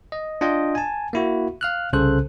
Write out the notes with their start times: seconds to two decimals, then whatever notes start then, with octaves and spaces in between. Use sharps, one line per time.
0.12 D#5
0.41 D4 F4 D#5 G5
0.75 G#5 A5
1.13 A#3 E4 F#4
1.61 F5 F6 F#6
1.93 C2 C#3 A4 C5 F#6